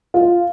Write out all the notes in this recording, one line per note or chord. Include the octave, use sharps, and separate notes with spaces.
F4